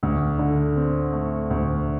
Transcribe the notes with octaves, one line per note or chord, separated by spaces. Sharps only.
D2
D3
C4
A3
D2